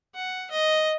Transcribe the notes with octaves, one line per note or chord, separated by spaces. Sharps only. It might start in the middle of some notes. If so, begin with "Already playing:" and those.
F#5
D#5